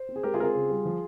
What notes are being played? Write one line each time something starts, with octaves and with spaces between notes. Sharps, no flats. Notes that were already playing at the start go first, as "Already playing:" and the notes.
Already playing: C5
C4
G#4
G#3 G4 A#4
F4 G#4
C4 F4 G#4 A#4
C#3
G3
F3